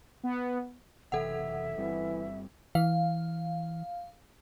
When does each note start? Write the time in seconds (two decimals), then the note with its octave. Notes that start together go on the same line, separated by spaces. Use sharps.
0.24 B3
1.12 F#1 C3 E3 A4 E5 F#5
1.77 G1 E3 G3 C4
2.75 E3 F5